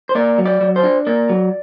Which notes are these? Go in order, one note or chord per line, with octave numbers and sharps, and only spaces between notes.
C5
A#3 D5
F#3
D5
F#3
C5
D4
A#3 D5
F#3